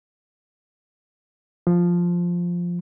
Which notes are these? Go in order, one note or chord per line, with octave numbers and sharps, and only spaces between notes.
F3